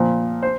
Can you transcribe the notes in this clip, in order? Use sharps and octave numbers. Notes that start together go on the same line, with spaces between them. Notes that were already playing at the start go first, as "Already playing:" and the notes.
Already playing: A#2 F3
C5